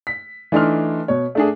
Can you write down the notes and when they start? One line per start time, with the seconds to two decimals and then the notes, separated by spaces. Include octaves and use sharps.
0.07 B6
0.52 E3 A3 D4 D#4 C6 F6
1.08 B2 C#5
1.35 A3 D4 G#4